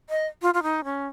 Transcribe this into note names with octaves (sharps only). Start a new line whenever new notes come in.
D#5
F4
F4
D#4
C#4